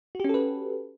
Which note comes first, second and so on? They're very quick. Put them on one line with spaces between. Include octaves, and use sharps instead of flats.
F#4 G4 C#4 A4 B4